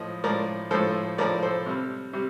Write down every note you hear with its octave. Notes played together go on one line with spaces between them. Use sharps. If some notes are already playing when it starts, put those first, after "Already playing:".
Already playing: A2 F3 D#5
A2 F3 A#4 D5
A2 F3 A4 C5
A2 F3 A#4 D5
A4 C5
C3 G3
C3 G3